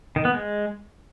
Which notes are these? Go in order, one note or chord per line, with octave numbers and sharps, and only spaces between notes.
D#3
B3
G#3